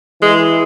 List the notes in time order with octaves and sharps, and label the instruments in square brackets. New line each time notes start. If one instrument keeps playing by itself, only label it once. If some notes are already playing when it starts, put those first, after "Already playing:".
[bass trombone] E3 [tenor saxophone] G#3